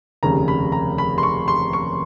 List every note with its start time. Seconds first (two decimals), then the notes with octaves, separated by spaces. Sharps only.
0.23 F1 D#2 C#3 A#5
0.48 B5
0.72 A#5
0.98 B5
1.18 C6
1.23 C#6
1.48 C6
1.73 C#6